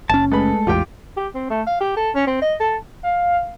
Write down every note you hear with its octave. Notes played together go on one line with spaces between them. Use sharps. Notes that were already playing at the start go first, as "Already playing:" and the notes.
F#1 C#4 A5
G#3 A3 G#4 A4 B4 B5
A1 E2 F4 G4 G5
G4
C4
A3
F5
G4
A4
C#4
C4
D#5
A4
F5